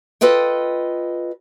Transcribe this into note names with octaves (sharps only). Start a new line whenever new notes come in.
F4 A4 B4 D#5 G5